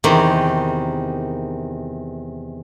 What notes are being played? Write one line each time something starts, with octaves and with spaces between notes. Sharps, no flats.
E2 C3 D#3